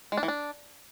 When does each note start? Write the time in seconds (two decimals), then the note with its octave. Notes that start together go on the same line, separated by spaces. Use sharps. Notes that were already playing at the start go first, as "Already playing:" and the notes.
0.12 G#3
0.17 D4
0.23 E3
0.28 D4